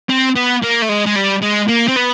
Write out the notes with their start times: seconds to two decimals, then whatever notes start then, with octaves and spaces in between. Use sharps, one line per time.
0.10 C4
0.36 B3
0.62 A#3
0.82 A3
0.89 G#3
1.06 G#3
1.16 G3
1.43 G#3
1.69 A#3
1.88 C4
1.97 B3